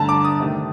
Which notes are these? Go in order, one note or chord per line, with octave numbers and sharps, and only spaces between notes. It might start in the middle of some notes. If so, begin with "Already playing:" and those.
Already playing: G2 D3 A3 A5 A#5
D6
D#6
C3 D#3 A3